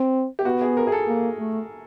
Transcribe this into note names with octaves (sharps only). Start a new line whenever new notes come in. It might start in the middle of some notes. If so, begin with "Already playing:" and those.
Already playing: C4
G4
B3 F#4
G#4
A#4
G#4
A4
A#3
A3